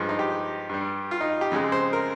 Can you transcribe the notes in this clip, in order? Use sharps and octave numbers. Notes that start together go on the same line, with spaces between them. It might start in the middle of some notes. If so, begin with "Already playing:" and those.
Already playing: G2 F3 G#3
D#4
G4
G2 G3
F4
D#4
G4
F2 C#3 G#3
C5
A#4